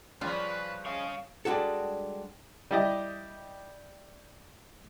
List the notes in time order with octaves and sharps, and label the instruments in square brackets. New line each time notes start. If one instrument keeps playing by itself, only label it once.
[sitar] C#3 F3 [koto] G3 F4 [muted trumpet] B4
[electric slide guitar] C#5 F5 [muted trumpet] D#5
[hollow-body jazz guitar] G3 G#3 D4 F#4 A4
[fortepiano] G3 E4 G4 D5 D#5